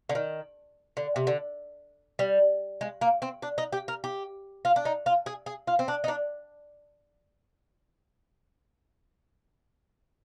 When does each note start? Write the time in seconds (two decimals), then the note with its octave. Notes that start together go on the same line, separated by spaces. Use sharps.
0.09 D3
0.15 D#3
0.97 D3
1.16 C3
1.27 D3
2.19 G3
2.81 G#3
3.01 A#3
3.22 C4
3.42 D4
3.58 D#4
3.72 G4
3.88 A#4
4.04 G4
4.65 F4
4.76 D4
4.85 D#4
5.06 F4
5.26 G#4
5.46 G#4
5.67 F4
5.79 C4
5.88 D4
6.04 D#4
6.08 D4